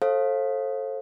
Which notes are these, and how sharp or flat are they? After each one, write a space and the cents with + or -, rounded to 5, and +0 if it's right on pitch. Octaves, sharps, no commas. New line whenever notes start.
A4 +0 C5 +40 F5 +0